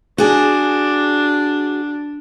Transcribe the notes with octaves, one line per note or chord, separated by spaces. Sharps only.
D4 F#4 G#4